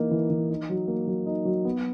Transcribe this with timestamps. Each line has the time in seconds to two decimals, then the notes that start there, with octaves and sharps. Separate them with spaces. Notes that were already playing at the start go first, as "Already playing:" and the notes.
Already playing: E3 A#3 D#4
0.11 E3
0.30 E3
0.50 D#4
0.70 F#3
0.88 A#3
1.07 F#3
1.26 D#4
1.45 F#3
1.65 B3